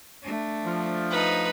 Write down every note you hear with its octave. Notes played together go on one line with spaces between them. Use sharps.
A3 D4
F3
D#4 B4